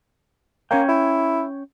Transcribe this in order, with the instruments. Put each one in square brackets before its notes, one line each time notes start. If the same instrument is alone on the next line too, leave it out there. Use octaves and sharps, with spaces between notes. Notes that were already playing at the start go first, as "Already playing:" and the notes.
[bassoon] A#3 [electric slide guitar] C#4 C#5 G5
[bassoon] E4